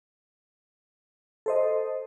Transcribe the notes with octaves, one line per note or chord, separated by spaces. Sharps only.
A4 C5 D#5